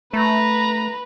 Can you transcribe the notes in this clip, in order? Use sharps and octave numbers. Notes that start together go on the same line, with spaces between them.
A3 B4 A#5